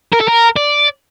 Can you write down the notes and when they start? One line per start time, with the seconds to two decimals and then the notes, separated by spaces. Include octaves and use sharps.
0.12 A#4
0.20 A4
0.28 A#4
0.56 D5